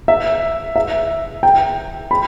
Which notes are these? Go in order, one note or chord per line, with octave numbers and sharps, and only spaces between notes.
E5
E5
G5
B5